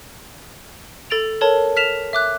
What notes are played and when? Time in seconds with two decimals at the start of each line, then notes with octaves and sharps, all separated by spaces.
1.10 A4 A6 D7 F7
1.41 A4 A#4 C#5 A5
1.76 F6 B6 E7 F7
2.13 E5 D6 F#6